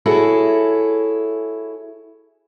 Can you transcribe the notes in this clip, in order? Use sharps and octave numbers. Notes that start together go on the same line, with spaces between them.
E4 F#4 G#4 A4 C#5